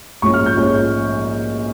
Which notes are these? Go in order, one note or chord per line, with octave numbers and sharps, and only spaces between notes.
A#1 G#2 F3 G#3 C#4 C#6
F6
G6
A#1 G#2 F3 G#3 C#4